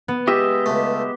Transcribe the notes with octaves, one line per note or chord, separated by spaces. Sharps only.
B3
G#3 G4 D#5 E5
C#2 A3